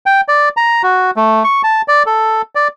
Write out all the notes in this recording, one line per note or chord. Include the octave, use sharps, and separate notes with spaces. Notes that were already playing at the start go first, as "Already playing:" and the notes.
G5
D5
A#5
F#4
A3
C#6
A5
D5
A4
D5